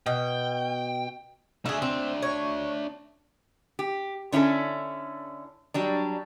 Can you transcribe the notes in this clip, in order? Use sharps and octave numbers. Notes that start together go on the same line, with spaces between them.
B2 G5
A3 D4 G#4 E5
C4
C#5
G4
D3 C#4 E4 G#4 A4
F#3 G3 D4